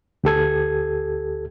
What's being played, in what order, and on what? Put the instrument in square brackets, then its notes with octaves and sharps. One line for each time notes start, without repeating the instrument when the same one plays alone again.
[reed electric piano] D2 G4 A4 G#6